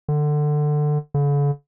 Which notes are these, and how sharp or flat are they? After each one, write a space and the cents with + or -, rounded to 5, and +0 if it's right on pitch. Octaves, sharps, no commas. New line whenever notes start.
D3 +20
D3 -45